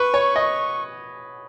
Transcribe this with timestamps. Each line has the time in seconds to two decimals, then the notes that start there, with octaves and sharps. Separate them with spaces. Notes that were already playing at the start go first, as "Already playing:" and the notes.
Already playing: B4 C#6
0.14 C#5
0.36 D#5